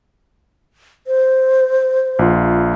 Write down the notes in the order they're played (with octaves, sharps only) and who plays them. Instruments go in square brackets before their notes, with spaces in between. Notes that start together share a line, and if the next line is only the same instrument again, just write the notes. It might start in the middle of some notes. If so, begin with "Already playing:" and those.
[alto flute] C5
[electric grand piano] A#1 F4